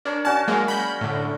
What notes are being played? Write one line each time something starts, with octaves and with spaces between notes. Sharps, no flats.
D4 A#4 C#5 D5
C#4 F#4 D5 A5
F#3 G#3 A#3
B5 G6
A2 D3 A3